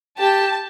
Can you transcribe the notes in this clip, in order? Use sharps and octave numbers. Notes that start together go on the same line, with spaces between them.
G4 A5